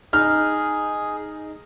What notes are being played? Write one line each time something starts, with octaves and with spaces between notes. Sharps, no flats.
D#4 G#4 F6